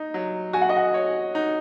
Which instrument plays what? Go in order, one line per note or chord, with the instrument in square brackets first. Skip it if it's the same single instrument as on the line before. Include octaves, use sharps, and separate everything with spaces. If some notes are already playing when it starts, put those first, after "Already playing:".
Already playing: [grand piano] D#4
F#3
[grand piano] F#4 [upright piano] G#5
[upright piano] F#5
D#5
F#5
[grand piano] C#5
D#4